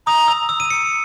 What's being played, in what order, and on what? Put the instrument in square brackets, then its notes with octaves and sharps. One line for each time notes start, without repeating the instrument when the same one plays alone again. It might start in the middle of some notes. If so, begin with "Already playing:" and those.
[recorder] A#5 [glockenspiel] D#6
[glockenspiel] E6
E6
D#7
C#7